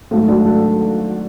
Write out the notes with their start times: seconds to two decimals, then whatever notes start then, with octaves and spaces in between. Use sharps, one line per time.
0.11 G#1 G#2 F#3 A3
0.28 D4 F#4
0.45 F#4 A4